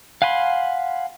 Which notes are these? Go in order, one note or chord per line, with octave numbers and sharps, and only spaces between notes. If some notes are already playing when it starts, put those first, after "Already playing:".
F5 F#5 G#5 B5 C6